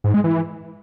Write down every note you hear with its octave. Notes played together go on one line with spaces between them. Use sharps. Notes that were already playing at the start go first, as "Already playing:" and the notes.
G#2
G#3
E3